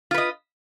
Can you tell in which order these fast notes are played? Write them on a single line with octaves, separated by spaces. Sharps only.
F4 B4 D#5